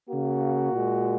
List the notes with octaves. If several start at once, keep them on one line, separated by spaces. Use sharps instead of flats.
C#3 A#3 F#4
A#2 G#3